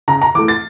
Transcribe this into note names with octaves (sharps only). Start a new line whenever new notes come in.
C#3 A#5
A#5
E3 A3 D6
A6